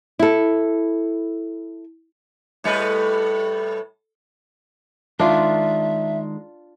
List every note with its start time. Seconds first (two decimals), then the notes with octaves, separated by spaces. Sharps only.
0.19 E4 A4
2.64 A2 G3 B4
5.20 D#3 G#3 D4 F4 E5